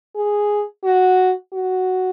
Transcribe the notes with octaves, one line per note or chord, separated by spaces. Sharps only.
G#4
F#4
F#4